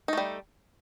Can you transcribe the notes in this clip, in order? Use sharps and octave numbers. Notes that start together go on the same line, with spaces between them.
G3 A3 D#4